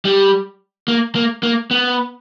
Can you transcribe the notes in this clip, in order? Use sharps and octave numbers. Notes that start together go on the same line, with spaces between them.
G3
A#3
A#3
A#3
B3